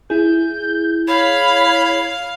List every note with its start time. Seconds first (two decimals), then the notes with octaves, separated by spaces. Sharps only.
0.10 E4 G#4 G6
1.08 C#5 F5 B5